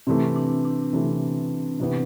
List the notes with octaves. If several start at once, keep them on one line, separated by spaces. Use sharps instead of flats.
C3 E3 A3 C4
D4
D4
C3 E3 A3
C3 E3 B3